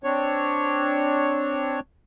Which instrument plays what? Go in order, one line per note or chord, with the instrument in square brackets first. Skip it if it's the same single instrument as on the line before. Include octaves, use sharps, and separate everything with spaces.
[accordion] C4 D4 C#5